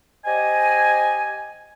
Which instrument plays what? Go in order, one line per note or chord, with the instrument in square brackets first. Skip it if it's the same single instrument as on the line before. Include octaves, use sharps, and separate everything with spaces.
[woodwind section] G4 C5 D#5 G#5